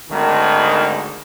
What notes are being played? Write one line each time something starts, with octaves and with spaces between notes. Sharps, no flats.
G#1 D2 D#3